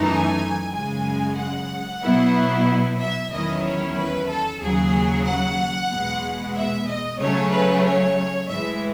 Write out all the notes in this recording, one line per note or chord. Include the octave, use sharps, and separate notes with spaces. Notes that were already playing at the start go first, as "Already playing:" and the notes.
Already playing: F#2 E3 A3 D#4
G#5
F#2 C#3 G#3 G#5
F#5
B2 F#3 B3 E4
E5
E2 D#3 F#3 C#4 E4 D#5
C#5
B4
A4
D#2 C#3 F#3 G#4
F#5
E2 B2 G#3
E5
D#5
C#3 F#3 A3 C#4 C#5
B4
C#5
A2 E3 G#3 E5